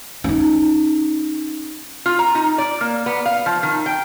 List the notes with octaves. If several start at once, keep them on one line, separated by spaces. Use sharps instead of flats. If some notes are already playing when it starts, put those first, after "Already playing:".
C#4 D#4
F4
A#5
D#4
D5
A#3
B3
F5
F3
D#3
G5